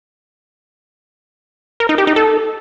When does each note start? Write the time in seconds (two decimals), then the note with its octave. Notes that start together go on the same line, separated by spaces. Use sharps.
1.80 A#4
1.89 D#4
1.98 G4
2.07 D#4
2.16 A4